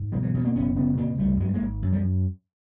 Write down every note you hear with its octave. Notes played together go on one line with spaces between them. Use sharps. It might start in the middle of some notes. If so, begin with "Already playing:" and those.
Already playing: G#2
B2 F3 G3
E3 F#3
B2 E3 F#3
A#3 C4
F#1 B3 C#4
C#3 B3 C#4
A#2 A#3 C4
C2 G3 A3
G2 F#3 G#3
G#3 A#3
G#1
F#2
F3 G3